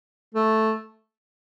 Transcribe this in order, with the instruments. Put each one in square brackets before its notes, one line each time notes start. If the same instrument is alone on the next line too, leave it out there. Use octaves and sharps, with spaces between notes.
[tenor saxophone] A3